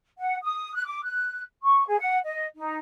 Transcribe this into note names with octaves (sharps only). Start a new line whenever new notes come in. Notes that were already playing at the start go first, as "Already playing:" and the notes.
F#5
D#6
F#6
D6
F#6
C#6
G#4
F#5
D#5
D#4